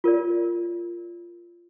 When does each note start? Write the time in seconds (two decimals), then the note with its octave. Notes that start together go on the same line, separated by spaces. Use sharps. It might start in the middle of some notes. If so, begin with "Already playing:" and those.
0.04 F4 A#4 D5